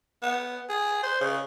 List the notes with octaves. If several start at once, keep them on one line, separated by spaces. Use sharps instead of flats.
B3
G#4
C5
C#3